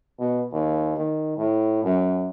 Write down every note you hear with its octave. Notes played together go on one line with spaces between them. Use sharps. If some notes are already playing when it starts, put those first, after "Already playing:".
B2
D#2
D#3
A2
F#2